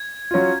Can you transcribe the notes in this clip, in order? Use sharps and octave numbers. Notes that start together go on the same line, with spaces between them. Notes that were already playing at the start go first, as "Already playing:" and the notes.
Already playing: G#6
F#3 C#4 F4